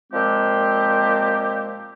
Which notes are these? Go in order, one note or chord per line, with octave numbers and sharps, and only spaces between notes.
A#2 F3 G#3 C4 G4